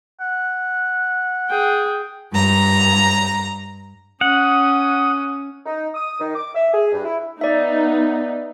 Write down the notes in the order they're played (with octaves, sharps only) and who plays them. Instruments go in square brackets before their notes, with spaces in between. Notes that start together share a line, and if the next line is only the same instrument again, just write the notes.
[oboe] F#5
[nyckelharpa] G#4 G5
[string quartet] G2 A#5
[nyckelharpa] C#4 [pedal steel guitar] F#5 [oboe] D#6
[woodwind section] D#4
D#6
D#3
D6
E5
G#4
G2
E4
[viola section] B3 D#4 [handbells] D5 E5